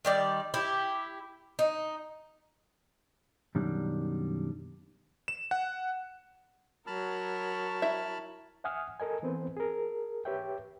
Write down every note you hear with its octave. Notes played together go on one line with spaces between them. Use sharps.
D#3 G3 D5
E4 G4
D#4
F#2 B2 D#3 G3 D4
E7
F#5
F#3 A#4 A5 B5 F6
E4 E5
E5 F#5 G#5 D#6 F6
A4 A#4 D#5 G#5
E3 B3 C4 B4 C5
G#4 A#4
G4 B4 C#5 E5 G5